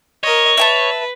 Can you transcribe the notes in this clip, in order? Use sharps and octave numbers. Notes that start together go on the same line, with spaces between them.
A#4 C#5 D#5
B4 E5 G#5 A5